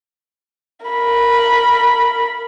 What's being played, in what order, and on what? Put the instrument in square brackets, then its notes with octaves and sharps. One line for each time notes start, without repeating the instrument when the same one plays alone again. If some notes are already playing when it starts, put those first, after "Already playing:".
[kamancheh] A#4 B5